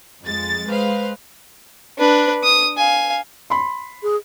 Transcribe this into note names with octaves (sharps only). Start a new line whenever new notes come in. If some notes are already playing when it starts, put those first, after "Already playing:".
F2 G#3 A6
G#3 B4 C5 F5
D4 B4
D#6
F5 G#5
B5 C6
G#4